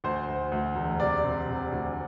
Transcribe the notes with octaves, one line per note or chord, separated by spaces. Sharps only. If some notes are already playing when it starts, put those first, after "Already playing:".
D2 C5
D2
D2
E1
C3 D5
C3
C3
D2